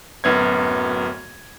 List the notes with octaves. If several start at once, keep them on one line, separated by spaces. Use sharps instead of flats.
D1 F#2 B3 G#6